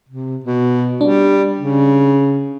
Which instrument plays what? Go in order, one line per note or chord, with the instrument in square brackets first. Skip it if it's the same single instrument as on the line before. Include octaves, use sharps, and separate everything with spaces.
[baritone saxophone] C3
B2
[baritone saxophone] G3 [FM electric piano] D4
[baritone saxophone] C#3